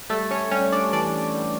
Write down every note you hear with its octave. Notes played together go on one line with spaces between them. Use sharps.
G3 A3 A4
C#4 C#5
G3 C#4 C#5
D4 D5
E3 D4 D5
G3